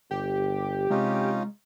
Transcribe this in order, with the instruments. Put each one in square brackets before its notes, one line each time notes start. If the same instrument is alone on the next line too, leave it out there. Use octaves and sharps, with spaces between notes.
[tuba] G1 [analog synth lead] G4
[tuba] C3 [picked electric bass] G#3 [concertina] C#4 D#4 F4